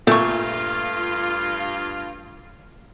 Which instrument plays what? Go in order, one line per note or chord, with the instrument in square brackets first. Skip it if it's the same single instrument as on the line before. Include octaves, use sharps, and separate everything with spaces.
[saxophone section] G2 F4 [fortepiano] A#2 [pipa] A3 C#6